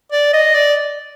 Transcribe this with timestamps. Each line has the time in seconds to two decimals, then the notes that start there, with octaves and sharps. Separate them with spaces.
0.12 D5
0.33 D#5
0.55 D5